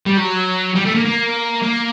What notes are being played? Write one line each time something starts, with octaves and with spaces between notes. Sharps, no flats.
G3
F#3
G3
A3
A#3
A#3
A#3